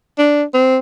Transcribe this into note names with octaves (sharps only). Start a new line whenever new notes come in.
D4
C4